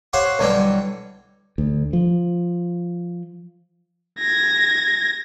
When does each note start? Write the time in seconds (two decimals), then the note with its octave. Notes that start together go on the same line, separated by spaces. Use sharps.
0.13 G4 C5 C#5 F5 F#5 C6
0.39 B1 D3 E3 G3 E4 G5
1.58 D2
1.93 F3
4.19 G#6 A#6